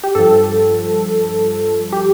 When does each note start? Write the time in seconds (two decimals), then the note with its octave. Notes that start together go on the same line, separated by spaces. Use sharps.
0.04 G4
0.15 G2 F3 A4
1.93 G4